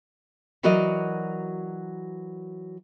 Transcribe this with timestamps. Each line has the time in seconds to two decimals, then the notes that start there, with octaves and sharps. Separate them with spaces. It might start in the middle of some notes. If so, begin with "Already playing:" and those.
0.63 E3 F#3 F#4 A#4 D5 D#5